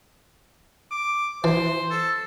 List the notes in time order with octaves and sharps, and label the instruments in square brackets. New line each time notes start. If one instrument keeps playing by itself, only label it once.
[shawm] D6
[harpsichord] E3 [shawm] C5
[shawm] A4